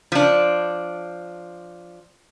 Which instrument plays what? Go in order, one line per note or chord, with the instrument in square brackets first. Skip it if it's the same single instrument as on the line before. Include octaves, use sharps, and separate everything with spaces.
[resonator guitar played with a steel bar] F3 D4